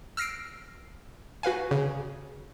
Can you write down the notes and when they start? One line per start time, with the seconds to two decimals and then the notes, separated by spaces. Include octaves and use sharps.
0.17 E6 F6 A#6 C7 D7
1.43 F#4 B4 F5 G#5
1.71 C#3